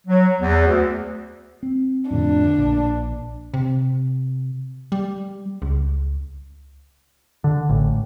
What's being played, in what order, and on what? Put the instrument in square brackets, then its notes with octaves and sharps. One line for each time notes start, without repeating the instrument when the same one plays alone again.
[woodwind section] F#3
E2
D2
[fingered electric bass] C4
[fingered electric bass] F2 A2 D3 [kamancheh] D4
[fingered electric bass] A#1
[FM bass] C3
G3
C#2
[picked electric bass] D3
A1